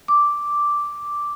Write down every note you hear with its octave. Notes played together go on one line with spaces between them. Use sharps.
D6